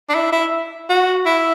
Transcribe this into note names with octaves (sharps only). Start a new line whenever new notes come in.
D4
E4
E4
F#4
E4